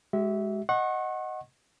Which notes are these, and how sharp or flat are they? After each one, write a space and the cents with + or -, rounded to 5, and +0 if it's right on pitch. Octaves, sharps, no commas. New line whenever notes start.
G#3 +0 F#4 +45 E5 -10
D#5 +0 F#5 +0 C#6 -35